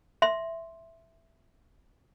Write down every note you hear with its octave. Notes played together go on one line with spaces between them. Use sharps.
E5 C6